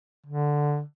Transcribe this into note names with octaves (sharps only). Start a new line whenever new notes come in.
D3